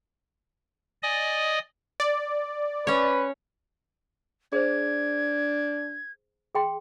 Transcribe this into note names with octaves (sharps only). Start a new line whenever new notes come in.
D5 D#5 G#5 D#6
D5
C#4 B4 C#5
D4 G#4 C5 G#6
G#4 G5 C6